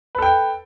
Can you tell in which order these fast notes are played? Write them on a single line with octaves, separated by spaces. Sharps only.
B4 A4 G5